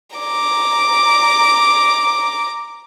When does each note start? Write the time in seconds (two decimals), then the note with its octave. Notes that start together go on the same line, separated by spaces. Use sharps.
0.16 A#5 D6